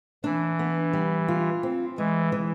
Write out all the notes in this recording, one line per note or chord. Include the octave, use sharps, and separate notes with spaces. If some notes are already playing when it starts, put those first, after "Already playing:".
E3 D4
B3
G3
F4
C4
E3 G#3
E3